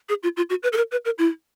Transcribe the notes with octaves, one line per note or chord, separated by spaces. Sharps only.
G#4
F4
F4
F#4
B4
A4
A#4
B4
A#4
E4